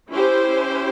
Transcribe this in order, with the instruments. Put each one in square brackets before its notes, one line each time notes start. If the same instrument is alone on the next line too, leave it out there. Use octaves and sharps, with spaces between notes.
[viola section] C#4 E4 G4 C5